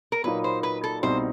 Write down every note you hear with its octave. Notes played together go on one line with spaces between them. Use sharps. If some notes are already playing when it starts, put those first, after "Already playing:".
A#4
A#2 F#3 A#3 D#4 B4
C5
B4
A4
C2 B2 G3 C4 D#4 C5